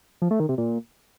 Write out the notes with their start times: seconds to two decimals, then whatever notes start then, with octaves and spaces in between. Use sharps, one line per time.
0.22 F3
0.31 A3
0.40 D#3
0.49 C3
0.58 A#2